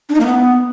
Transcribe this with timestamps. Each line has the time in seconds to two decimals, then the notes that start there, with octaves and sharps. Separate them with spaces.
0.09 D4
0.15 D#4
0.20 A#3
0.26 B3